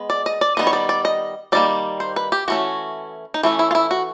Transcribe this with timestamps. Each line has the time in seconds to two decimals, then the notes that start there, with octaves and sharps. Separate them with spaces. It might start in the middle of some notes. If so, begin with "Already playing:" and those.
Already playing: G#3 B3
0.10 D5
0.26 D#5
0.41 D5
0.57 D#3 G3 B3 D#5
0.67 C#5
0.73 D5
0.89 D5
1.05 D#5
1.52 D#3 G3 A#3 D5
2.00 C5
2.16 B4
2.32 G4
2.48 E3 A3 C#4 F#4
3.34 D#4
3.43 E3 A3 C#4 E4
3.59 E4
3.71 F4
3.75 E4
3.91 F#4